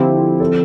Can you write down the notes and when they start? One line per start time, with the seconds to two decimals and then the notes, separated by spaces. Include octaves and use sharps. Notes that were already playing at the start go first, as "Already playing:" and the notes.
Already playing: D3 F3 C4 E4 G4
0.40 A4